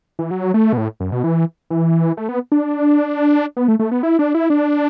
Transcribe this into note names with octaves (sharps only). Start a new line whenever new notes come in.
E3
F#3
A3
B2
A2
F#2
B2
E3
E3
A3
B3
D4
B3
A3
A3
B3
E4
D4
E4
D4